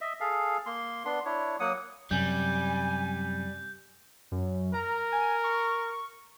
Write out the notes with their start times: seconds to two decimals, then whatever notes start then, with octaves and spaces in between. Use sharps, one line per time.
0.01 D#5 E5
0.20 G#4 A4 F5
0.66 A#3 C6
1.05 B3 D4 C6
1.25 D4 E4 C#5
1.60 F#3 A#3 F#5 D#6
2.11 F#2 C3 G3 G#5 G6
4.32 F#2
4.74 A#4 A#5
5.12 G#5
5.44 C#6